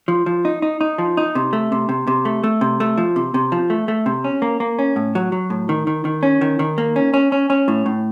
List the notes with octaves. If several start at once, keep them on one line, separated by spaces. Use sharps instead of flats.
F3
F3
D#4
D#4
D#4
F3
D#4
C3
A3
C3
C3
C3
A3
A3
C3
A3
F3
C3
C3
F3
A3
A3
C3
C#4
A#3
A#3
C#4
A2
F#3
F#3
A2
D#3
D#3
D#3
C#4
D#3
D#3
A#3
C#4
C#4
C#4
C#4
A2
A2